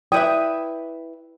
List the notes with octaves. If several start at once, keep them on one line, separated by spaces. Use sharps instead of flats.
E4 B4 D5 E5 G5 D#6